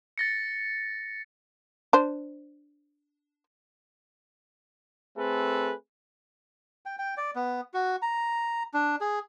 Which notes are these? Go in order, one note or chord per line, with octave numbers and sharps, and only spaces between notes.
A6 A#6 C#7
D4 C5
A3 C4 G#4 A4 B4
G5
G5
D5
B3
F#4
A#5
D4
G#4